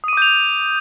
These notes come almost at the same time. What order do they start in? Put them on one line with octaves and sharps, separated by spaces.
D#6 D#7 D6 G6 F7